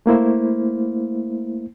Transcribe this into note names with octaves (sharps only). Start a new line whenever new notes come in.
A3 A#3 E4 C5